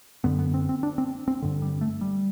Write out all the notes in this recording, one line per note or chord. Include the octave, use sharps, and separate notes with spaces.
F#2 D3 B3
B3
C4
C4
D4
C4
C4
G2 D3
G3
A3
G3